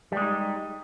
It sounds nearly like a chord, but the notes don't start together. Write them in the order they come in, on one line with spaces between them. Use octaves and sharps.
G3 G#3 D#4